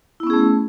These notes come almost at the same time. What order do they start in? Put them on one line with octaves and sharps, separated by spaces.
E4 B3 C#4 G#4 A3